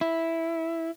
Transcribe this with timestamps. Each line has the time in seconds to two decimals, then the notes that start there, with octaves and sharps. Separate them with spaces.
0.01 E4